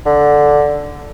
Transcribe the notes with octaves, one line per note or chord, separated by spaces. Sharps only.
D3